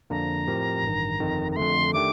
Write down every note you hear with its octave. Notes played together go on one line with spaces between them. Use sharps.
F2 D3 F3 A#3 D4 A#5
A2 F3 C4 G4 A#4
A1 G2 D#3
G1 F2 D#3
A#5
F2 D3 A3 C6
D#3 A3 D4 G4 D6